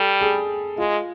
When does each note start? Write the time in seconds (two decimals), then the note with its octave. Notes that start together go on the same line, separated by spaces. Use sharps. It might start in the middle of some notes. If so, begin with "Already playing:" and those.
Already playing: G3 A4
0.21 G#4
0.78 G#3 F4